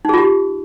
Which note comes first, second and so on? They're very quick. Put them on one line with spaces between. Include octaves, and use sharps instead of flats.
D#4 G#4 F4 G4